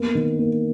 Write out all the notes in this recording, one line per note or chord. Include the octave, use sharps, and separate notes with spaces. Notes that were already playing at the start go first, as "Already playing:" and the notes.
Already playing: A#3 B3
D#3
A#3